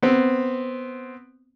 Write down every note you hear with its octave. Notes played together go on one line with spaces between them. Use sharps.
B3 C4